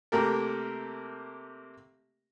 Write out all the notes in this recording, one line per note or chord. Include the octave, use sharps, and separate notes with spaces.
C3 A3 A#3 G4 A4 A#4